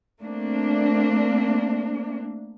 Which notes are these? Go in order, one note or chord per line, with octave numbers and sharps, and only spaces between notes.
A3 A#3 C4 D4